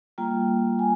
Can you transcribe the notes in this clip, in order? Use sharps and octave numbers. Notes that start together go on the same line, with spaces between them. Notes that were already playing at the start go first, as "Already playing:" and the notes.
G3 A#3 F4 G5
G#5